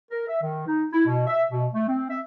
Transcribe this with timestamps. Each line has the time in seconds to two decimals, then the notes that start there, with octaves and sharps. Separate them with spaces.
0.11 A#4
0.28 E5
0.42 D#3
0.67 D#4
0.93 E4
1.06 B2
1.26 E5
1.51 B2
1.73 A3
1.88 C4
2.10 E5